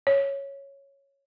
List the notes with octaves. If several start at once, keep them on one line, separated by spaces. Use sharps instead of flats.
C#5